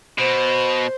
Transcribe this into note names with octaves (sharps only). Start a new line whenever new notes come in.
B2 C5